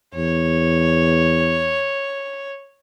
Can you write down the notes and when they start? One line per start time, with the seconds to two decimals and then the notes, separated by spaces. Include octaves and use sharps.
0.15 E2 C#5